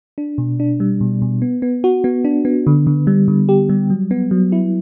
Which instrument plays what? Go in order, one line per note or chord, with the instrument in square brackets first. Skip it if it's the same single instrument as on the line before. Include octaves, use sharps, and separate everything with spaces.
[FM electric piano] D4
B2
D4
G3
B2
B2
B3
B3
F#4
B3
D4
B3
D3
D3
G3
D3
G4
G3
F#3
B3
F#3
E4